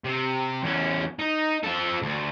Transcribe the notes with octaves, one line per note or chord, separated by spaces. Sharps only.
C3
E2 C#4
D#4
F3 A4
D2